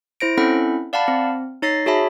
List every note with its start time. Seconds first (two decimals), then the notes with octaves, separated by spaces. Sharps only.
0.20 E4 C5 A#6 D7
0.37 C4 C#4 E4 A4 F#5 B5
0.93 D5 F5 F#5 A5 B5
1.08 C4
1.62 D#4 C#5 A6 A#6 C7
1.86 F#4 G#4 C#5 E5 A5 B5